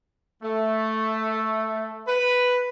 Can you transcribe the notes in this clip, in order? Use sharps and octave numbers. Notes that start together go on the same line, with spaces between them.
A3
B4